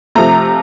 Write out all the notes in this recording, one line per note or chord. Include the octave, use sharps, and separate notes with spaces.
C3 F3 A3 A#5